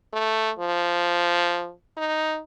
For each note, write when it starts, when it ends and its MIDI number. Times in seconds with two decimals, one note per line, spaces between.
0.13 0.51 57
0.59 1.71 53
1.97 2.40 63